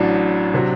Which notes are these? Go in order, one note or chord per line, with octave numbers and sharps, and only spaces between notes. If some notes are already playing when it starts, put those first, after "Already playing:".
Already playing: A1 A2 F#3 D4
C3 F#3